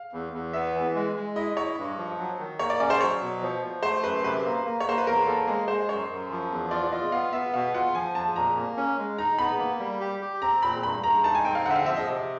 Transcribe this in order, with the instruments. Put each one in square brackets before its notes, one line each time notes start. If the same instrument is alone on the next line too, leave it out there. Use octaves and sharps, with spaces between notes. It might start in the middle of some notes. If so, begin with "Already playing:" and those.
Already playing: [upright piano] F5
[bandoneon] E2
E2
[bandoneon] B3 [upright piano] E5
[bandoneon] E3
G#3
G#3
[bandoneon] E4 [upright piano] D#5
[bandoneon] E4 [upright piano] C#5
[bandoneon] G2
F3
F#3
D#3
[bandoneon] A#3 [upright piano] C#5
[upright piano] D5
[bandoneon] C#4 [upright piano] D5
[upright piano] C5
[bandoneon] F#3 [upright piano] C#5
[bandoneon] B2
F3
F3
[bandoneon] A3 [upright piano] C5
[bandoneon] F#2 [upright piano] B4
[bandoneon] C3 [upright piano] B4
[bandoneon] A#3
A#3
[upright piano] C#5
[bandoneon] A#3 [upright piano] C5
[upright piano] B4
[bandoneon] E2 [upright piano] A#4
[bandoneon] A#3 [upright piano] A4
[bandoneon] G#3 [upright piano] G#4
[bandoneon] G#3 [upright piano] C5
[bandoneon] F#2 [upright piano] C#5
[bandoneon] F#2
F3
E2
[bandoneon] F4 [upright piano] D5
[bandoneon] F4 [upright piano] D#5
[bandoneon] B3 [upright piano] F5
[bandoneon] B3 [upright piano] E5
[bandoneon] B2 [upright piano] F5
[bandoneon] F4 [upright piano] F#5
[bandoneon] F3 [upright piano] G#5
[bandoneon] F2 [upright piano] A5
[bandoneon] A#2 [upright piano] A#5
[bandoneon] A#3
C#4
G#3
[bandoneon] D#4 [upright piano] A#5
[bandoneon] B3 [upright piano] B5
[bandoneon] A#3
G3
G4
G4
[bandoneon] C4 [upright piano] A#5
[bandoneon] A#2 [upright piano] B5
[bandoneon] G2 [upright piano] B5
[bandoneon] G2 [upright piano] A#5
[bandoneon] D#4 [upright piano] A5
[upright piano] G#5
[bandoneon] C4 [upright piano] G5
[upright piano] F5
[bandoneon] D3 [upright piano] F#5
[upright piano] E5
F5
[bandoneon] F3 [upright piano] E5
[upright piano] D#5
[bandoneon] C3